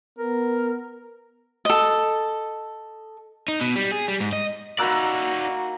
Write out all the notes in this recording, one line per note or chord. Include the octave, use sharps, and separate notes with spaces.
B3 A#4
A4 D#5
D#4
B2
G3
G#4
G3
G#2
D#5
A#3 D#4 F#4 D5 A#5 B5 E6 F#6